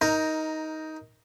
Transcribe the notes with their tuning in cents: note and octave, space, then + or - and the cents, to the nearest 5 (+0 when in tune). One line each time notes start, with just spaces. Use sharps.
D#4 +15 A#4 +0